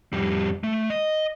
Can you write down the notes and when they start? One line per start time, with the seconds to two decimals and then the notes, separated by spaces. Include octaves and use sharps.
0.13 F2 G3
0.63 A3
0.90 D#5